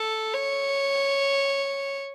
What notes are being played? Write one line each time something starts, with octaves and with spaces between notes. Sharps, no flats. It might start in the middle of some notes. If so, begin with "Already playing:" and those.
Already playing: A4
C#5